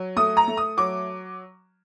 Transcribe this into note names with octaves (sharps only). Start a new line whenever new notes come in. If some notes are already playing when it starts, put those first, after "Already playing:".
Already playing: F#3
A3 D#6
A#5
A3
D#6
F#3 D6